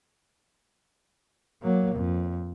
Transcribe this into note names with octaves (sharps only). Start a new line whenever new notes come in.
F#3 A#3
F2